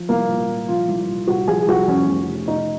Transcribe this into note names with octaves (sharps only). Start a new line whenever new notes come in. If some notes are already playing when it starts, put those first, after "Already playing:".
Already playing: F3
C2 A#3
A#2
C2
F3 F4
C2
A#2
C2 F#4
F3 G#4
C2 F#4
F2 C#4
F1
C3
F1 D#4